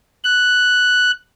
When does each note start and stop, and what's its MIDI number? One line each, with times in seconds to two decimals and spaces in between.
0.24 1.11 90